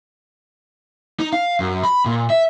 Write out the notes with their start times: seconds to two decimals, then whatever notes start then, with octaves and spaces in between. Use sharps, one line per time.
1.20 D#4
1.33 F5
1.60 F#2
1.83 B5
2.06 A#2
2.30 E5